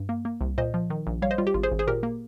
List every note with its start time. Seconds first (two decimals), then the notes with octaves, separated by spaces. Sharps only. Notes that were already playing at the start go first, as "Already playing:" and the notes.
Already playing: G2
0.09 A#3
0.25 A#3
0.41 C2
0.58 A#2 C5 D#5
0.74 F3
0.90 D#3
1.07 A#1
1.22 G3 C#5 F5
1.31 C5 D#5
1.38 G3 F4
1.47 G4
1.54 G#1 F4
1.63 G#4 C5
1.72 G#1
1.79 G#4 C5
1.87 A#2 G4 A#4
2.03 A#3